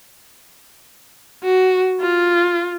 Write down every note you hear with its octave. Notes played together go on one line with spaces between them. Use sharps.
F#4
F4